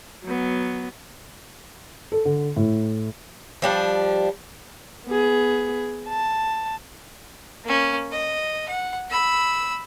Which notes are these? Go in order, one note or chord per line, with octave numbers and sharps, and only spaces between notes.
F#3 B3
A4
D3
A2
F3 G3 D4
B3 G#4
A5
A#3 C#4
D#5
F#5
B5 E6